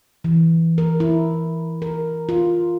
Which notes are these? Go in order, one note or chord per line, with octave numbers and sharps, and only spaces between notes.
E3
A#4
E4
A#4
F4